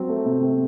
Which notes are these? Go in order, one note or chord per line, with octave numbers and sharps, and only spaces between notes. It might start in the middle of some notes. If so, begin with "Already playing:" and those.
Already playing: F#3 C4
A3
C3
C4